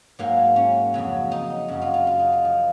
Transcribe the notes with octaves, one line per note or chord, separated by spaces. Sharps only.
G#2 F#3 A#3
C#4
F2 C#3 F#3
D#4
D#4
F#2 C#3 F#3 F#4
F4
F4
F4
D#4
F4
F3